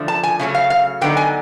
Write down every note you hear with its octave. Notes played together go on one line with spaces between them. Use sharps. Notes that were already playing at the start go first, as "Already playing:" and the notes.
Already playing: D3 F3 A3
A5
G#5
C#3 F#3 A3 C#4
F5
F5
D3 F#3 B3 D#4 G5
G#5